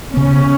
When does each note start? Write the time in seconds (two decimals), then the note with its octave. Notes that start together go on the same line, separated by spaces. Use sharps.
0.13 C#3 B3 C#4